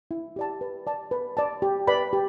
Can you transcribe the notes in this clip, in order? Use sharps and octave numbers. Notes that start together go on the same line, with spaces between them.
E4
G4 D5 A5
B4
D5 A5
B4
D5 A5
G4
B4 D5 B5
G4